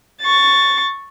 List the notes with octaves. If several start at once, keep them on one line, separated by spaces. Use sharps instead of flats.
C#6 A6